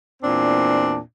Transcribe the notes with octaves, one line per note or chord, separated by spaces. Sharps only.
E2 A#2 C4 D4